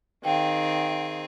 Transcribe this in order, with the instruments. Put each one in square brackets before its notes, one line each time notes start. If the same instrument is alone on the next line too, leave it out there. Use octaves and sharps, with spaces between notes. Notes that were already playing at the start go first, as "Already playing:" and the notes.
[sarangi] D#3 [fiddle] C4 G#4 [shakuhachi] F5 [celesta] G5